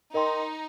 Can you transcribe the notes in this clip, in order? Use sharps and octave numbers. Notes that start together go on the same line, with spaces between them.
D#4 A#4 D#5 G5 C6